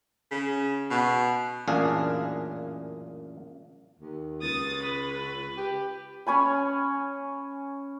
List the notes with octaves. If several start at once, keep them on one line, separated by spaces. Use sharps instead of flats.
C#3
B2
A1 F#2 A#2 D4 G#4 F5
D#2
C#2 D#6 A6
B4
G4
C#4 C#5 G#5 B5